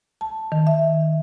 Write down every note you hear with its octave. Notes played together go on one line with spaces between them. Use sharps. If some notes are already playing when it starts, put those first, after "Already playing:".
A5
D#3
E5